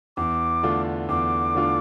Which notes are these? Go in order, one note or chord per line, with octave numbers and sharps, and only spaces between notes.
E2 D6
D3 A3 D4 F4
E2 D6
D3 A3 D4 F4